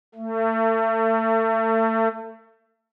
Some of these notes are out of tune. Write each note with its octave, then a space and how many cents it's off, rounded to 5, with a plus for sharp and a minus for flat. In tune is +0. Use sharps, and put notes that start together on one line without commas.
A3 +30